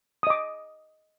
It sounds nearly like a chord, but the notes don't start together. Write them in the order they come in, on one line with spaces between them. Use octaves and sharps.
D#6 D#5 D6